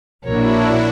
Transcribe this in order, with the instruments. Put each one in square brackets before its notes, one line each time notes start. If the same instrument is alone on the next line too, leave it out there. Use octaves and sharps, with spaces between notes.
[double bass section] A#1 A#2 [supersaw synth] D4 E4 F#4 [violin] A#4 C#5